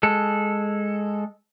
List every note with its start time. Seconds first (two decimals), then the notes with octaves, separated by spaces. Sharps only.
0.03 G#3 A4